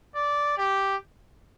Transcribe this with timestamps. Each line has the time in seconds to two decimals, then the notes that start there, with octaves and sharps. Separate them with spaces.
0.15 D5
0.58 G4